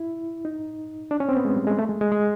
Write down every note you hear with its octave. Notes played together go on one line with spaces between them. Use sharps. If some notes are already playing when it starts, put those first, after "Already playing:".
Already playing: E4
D#4
D4
C#4
C4
B3
G#3
G3
G#3
A3
G#3
G#3
G#3